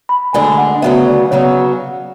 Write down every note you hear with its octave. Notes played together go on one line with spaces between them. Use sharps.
B5
D2 D3 G#3 D4 G#5
F#5
D2 C#3 F#3 B3 E5
D5
C#3 F#3 B3 C#5